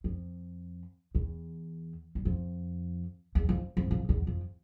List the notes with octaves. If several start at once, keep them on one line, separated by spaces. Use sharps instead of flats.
F2
E2
G2
F2
E2
F2
F2
F2
E2
F2